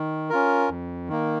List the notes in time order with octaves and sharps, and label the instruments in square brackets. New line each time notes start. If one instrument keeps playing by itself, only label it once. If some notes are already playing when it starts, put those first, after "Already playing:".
Already playing: [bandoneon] D#3
C#4 F4 A#4
F2
D#3 A#3